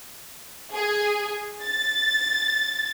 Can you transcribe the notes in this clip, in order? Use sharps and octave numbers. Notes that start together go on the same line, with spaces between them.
G#4
A6